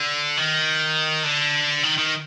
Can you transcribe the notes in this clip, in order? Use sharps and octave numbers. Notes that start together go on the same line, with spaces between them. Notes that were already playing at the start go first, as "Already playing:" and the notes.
Already playing: D3
D#3
D3
D#3
D#3